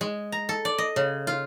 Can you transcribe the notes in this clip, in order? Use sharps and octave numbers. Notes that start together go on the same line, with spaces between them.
G#3
A#5
A4
D5
D#5
C#3
F4